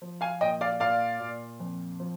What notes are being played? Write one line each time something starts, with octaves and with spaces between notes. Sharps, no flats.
F3
F5 G#5
A#2 D#5 G5
D5 F5
A#2 D5 F5
A#2
F2
F3